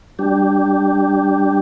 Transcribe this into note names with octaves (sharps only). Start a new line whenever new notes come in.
G3 D4 G4